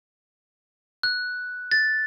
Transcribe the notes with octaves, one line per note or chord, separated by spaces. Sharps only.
F#6
A6